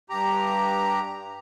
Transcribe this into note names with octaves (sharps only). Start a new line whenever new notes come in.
G2 G4 A#5